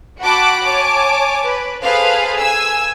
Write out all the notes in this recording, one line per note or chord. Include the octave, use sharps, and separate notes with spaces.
F#4 F#5 G5 A5 B5 D6
C#5 G#5 A5 D6
B4
G#4 A4 B4 C5 F5
G#5 E6